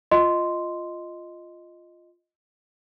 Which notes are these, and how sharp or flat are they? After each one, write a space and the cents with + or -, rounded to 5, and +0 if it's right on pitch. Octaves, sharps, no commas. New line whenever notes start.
F4 +0 D#5 +0 C6 -5